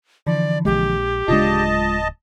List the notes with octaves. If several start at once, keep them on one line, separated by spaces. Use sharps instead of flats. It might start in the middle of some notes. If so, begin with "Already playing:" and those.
D3 E3 F3 D5
A#1 G#3 G4
D1 C#3 G#3 D4 F4 D#5 A5